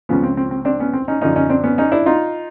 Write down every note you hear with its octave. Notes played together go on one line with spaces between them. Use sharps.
C#2 C#3 F3 B3 C#4
C4
C4
C4
C4 D4
B3 C#4
C4
C#4 D#4
F#2 D3 F3 C#4 D#4
C#4 D#4
C4 D4
B3 C#4
C#4 D#4
D4 E4
D#4 F4